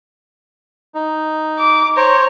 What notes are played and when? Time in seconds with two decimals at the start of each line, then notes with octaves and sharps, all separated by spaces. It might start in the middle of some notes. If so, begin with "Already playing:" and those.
0.95 D#4
1.59 D6
1.96 C5 C#5 A#5